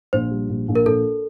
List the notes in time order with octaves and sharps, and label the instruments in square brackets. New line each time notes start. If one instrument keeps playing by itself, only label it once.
[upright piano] A#1 [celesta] C5
[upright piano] G3
A#1
A#1
[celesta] A#4
[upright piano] A#1 [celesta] A4